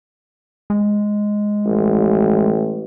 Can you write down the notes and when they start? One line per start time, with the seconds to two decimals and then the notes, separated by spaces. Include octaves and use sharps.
0.70 G#3
1.65 A1